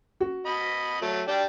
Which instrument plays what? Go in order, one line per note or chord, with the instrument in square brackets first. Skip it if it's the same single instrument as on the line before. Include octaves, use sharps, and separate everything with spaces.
[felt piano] F#4
[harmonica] D#5 B5
F#3 A3
D4 G4 G5